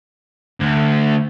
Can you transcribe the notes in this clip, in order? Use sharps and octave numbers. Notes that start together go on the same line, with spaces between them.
D2